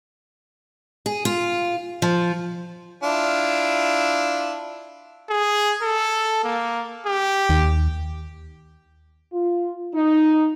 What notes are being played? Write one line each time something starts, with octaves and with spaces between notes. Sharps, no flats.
G#4
F4
F3
D4 E4 F4
G#4
A4
A#3
G4
D#2
F4
D#4